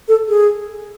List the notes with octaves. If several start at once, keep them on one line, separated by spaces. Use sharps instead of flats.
A4
G#4